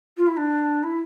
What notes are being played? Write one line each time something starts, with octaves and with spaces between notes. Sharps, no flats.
F4
E4
D4
E4